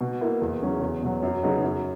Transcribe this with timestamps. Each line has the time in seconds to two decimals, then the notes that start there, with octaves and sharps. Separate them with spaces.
0.01 B2
0.21 A#3 E4
0.42 E2
0.62 C#3 F#3 C#4
0.82 E2
1.03 B2 F#3
1.22 F#2
1.43 C#3 F#3 B3 D#4
1.63 F#2